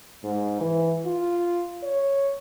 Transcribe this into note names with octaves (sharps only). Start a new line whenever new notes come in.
G#2
E3
F4
C#5